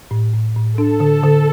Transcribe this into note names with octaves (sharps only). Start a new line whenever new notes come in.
A2
A2
A2
D4 A4
D3
D3